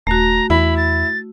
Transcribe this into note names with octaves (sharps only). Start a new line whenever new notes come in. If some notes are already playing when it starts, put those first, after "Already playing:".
D#1 A3 F#4 A#5
E2 E4 B5
A6